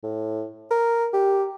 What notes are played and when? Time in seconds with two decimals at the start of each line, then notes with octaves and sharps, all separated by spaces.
0.03 A2
0.71 A#4
1.13 G4